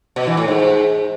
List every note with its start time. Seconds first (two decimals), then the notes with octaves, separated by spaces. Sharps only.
0.16 B2
0.27 E3
0.37 A2
0.48 G#2